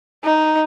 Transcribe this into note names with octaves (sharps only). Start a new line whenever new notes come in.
D#4